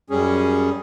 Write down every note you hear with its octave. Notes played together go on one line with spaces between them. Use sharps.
F#2 G3 C#4 G#4